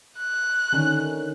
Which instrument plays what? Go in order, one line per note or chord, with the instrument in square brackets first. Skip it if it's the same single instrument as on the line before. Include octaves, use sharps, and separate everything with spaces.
[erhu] F#6
[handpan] D3 D#3 C#4